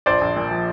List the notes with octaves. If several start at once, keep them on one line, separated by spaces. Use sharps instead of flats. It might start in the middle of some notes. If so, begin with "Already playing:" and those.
A#1 C5 D5
A#1
A#2
F3